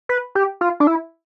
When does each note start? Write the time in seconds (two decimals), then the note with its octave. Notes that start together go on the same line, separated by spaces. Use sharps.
0.09 B4
0.35 G4
0.61 F4
0.80 D4
0.87 E4